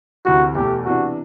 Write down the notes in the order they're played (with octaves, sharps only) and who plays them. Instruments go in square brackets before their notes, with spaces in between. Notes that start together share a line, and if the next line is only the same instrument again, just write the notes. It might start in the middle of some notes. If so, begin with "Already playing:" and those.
[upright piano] D2 C3 E3 [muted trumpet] F#4
[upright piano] E2 B2 A3 [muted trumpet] G4
[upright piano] C3 E3 B3 D4 [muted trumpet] F#4